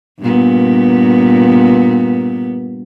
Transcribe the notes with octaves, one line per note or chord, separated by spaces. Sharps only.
G2 A#2 B3